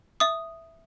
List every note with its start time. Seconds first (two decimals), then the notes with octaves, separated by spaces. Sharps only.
0.20 E5 D#6